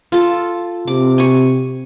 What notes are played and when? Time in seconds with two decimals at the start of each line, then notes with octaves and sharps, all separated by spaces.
0.12 F4 A4
0.87 C3 D6
1.18 G#5 C#6